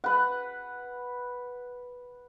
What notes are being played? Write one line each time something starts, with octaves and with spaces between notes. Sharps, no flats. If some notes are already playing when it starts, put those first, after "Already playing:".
B4 F#5